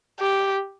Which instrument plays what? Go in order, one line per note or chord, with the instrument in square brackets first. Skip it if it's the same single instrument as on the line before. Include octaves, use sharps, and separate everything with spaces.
[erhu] G4